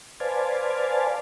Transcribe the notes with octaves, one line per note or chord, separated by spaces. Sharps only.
B4 C5 D5 F5 G#5 A5